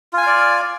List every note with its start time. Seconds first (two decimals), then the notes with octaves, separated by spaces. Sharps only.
0.13 F4
0.18 G#5
0.22 F5
0.27 D5